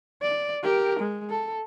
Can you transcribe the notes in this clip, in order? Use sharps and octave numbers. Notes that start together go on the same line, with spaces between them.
D5
G4 A#4
G#3
A4